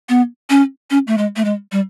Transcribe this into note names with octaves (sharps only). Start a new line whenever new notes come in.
B3
C#4
C#4
A3
G#3
A3
G#3
G3